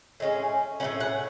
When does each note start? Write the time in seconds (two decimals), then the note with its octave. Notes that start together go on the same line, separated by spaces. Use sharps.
0.20 A2 G#3 C#4
0.80 A2 G#3 C#4 F#5
1.00 F#5